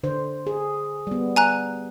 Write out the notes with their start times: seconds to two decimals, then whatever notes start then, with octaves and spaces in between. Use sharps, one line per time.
0.03 D3 C5
0.47 G#4
1.07 G3 B3
1.36 G#5 A#5 F#6